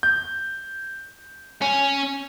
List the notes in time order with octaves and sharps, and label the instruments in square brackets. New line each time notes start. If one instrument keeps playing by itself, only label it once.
[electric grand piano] G6
[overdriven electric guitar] C#4